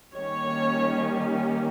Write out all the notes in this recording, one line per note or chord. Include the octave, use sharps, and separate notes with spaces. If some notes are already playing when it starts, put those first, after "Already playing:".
D#3 G3 A#3 C#4 C#5